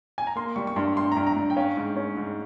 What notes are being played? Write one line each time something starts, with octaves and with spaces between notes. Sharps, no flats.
G#5
A#5
A#3 C6
G3 C#6
C#6
G2 C6
G2 C6
G2 A#5
A#5
G2
G5
C#4 F5
G#2
C#4
G#2